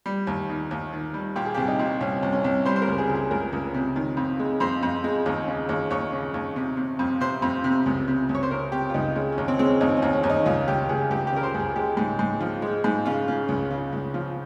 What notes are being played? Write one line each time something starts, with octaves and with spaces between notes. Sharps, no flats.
G3
D#2
D#3
D#2
D#3
G3
A#2 G4
G#4
C2 G4
D#4
A#2
C2 C#4
C2
C#4
C2
G3 C5
C5
A#4
C#2
G#4
C#2
G#4
C#2 A#4
C#2
C3
D#3
F2
G#3
F2 C5
F2
G#3
D#2
C#3
D#2
D#2 C#5
C#3
D#2
C3
C3
F2
C3 C5
F2
C3
C#2
C3
C#2
C#5
C5
C3 A#4
C3 G4
F4
C#2 D#4
G#3 C#4
C#4
D#2
C4
G#3 C4
C#4
D#2 D#4
C#4
D#2
C#4
D#2
D#4
C#2 F4
C#2 G4
C#2 G#4
C#2 G4
G4
C#3 A#4
C5
C#2
G#4
G#3 G4
G#2
G#2
F3
G#3
G#2
C#3 F4
C#3
C#2
C#3
C#2
F3